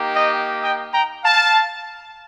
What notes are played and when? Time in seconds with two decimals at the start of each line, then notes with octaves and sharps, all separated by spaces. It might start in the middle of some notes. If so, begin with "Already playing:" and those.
Already playing: A#3 D#4 G4
0.15 D#5 G5
0.62 D#5 G5
0.93 G5 A#5
1.24 F5 A5